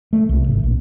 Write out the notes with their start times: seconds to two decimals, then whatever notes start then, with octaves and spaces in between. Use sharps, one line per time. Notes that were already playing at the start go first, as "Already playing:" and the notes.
0.13 A3
0.29 C2
0.48 G#1
0.64 A#1